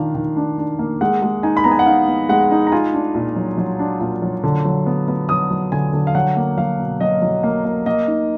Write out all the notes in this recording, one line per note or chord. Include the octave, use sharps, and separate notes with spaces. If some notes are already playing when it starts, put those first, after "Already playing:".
Already playing: D#3 D4 F4 F5
D#3
D4
D4
A#3
G#3 F#5
G#3
D#4 G#5
B5
B3 A#5
G#5
F#5
D#4 F5
B3
G#3 F#5
D#4
A#5
F4 G#5
D4
A#2
F#3
F#3
D4
A#2
F#3
D3
F#3
B3
B3
F#3 D#6
F#3
D3 G#5
D3
F5
F#3 F#5
A#3
F#3 F5
B2
F#3 D#5
F#3
A#3
A#3
A#3 D#5
D#4